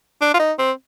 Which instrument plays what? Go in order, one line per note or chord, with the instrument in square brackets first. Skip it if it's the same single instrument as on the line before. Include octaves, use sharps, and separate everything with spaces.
[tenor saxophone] D4
F4
D#4
C4